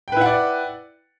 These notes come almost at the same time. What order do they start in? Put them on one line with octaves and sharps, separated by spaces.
G5 B4 E4 F#5 D5